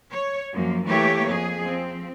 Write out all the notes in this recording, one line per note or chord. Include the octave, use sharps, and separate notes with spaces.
C#5
F#2 F3 A#3
E3 A3 A#3 G4 C#5
F2 G#4
F3 C4